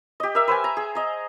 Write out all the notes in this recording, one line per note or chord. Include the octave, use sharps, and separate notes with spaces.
G4 D#5
A#4 E5
B4 C5 G5 G#5
A#5
G#4
D#5 A#5